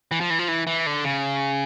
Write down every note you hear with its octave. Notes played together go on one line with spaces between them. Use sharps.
E3
F3
E3
F3
E3
E3
D3
C#3